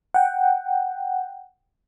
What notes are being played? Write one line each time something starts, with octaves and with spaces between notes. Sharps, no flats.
F#5 G5